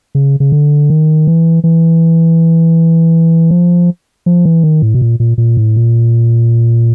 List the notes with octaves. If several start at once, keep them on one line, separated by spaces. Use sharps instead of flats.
C#3
C#3
D3
D#3
E3
E3
F3
F3
E3
D#3
A2
B2
A#2
A#2
A#2
A2
A#2